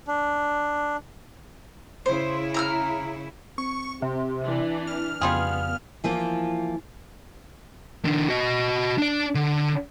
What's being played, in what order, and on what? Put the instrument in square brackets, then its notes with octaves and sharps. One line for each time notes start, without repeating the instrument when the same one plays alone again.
[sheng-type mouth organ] D4
[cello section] C#3 E4 [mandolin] C5
[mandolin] A#5 E6 F6
[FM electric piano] C4 [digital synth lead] C#6
[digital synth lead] C3 [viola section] G4
[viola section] E3 D4
[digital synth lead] F6
[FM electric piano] F2 C#3 [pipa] G3 F4 G#4 [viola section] B3
[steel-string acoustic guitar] E3 F3 A#3 F4
[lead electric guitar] D#3 D4
F#4 D#5
D4 D5
D3